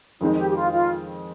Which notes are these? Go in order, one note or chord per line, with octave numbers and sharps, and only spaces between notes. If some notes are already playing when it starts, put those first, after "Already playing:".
F2 D#3 G#3 C4 D#4
G4
G4
F4
F4